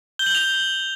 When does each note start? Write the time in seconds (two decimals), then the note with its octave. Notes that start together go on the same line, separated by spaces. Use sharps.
0.19 G6 G7
0.26 F#7
0.35 F7 G7